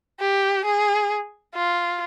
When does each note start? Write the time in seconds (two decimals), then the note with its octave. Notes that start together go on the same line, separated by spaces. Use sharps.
0.20 G4
0.65 G#4
1.55 F4